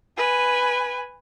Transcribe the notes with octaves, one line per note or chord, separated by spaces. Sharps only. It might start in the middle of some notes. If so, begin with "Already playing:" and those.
B4 G#5